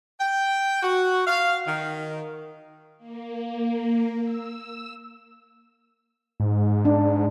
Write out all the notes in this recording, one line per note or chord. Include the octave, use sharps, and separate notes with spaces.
G5
F#4
F5
D#3
A#3
E6
G#2
D4